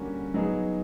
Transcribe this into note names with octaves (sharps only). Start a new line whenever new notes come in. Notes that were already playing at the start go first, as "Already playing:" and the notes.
Already playing: D3 G3 A#3 C#4 F#4
F#3 B3 D#4 G#4